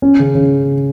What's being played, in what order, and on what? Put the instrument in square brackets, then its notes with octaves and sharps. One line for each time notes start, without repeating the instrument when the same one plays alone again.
[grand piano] C#4
C#3
C#3